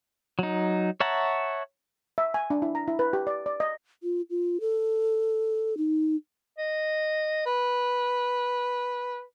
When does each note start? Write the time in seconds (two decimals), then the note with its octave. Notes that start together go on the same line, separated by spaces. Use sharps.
0.39 F#3 D#4
1.00 C#5 E5 F#5 A5 A#5
2.18 E5
2.34 G#5
2.50 D4
2.62 E4
2.75 A#5
2.88 E4
2.99 B4
3.13 G4
3.27 D5
3.46 D5
3.60 D#5
4.03 F4
4.30 F4
4.60 A4
5.77 D#4
6.58 D#5
7.46 B4